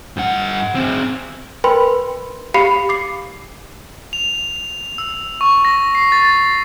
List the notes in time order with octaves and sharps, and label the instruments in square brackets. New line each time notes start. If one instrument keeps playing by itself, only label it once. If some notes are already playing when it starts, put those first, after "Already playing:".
[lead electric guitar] G2 F#5
C4 G#4
[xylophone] A#4 B4 G5 B5 C6
G4 F5 B5 C7 C#7
D6 C7
[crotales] F7
E6
C#6
A#6
C7
A6